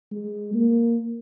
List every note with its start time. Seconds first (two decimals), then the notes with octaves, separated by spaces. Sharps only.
0.11 G#3
0.54 A#3